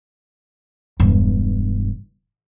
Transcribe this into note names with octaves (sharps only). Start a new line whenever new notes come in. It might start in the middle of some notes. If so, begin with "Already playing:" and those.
E1 G2